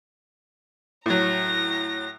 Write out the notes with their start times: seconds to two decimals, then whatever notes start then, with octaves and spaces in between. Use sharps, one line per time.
1.06 A2 F#3 A#5 A#6